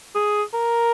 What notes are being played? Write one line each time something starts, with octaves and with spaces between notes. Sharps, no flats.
G#4
A#4